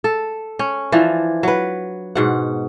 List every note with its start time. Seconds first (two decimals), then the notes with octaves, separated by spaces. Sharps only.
0.04 A4
0.59 C#4
0.92 E3 F3 D4
1.43 F#3 B4
2.15 G#2 B2 F#5